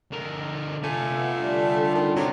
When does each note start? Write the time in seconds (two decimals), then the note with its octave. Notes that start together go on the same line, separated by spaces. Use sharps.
0.12 D3 A#4
0.84 A3 F4 G#5
1.15 B3 E5
1.39 D3 G3 D4
1.95 D#3
2.16 C3 F#3